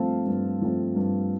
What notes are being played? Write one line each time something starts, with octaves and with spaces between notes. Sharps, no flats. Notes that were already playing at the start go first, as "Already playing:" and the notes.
Already playing: G2 F3 A3 C4 F5 A5
G2
F3 A3 C4
G2